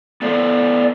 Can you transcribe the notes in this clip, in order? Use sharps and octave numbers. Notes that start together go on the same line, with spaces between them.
B3 A4 C5 D5